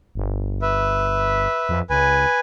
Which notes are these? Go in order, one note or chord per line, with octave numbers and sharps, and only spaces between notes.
G1
B4 E5
F2
C#2 B4 G#5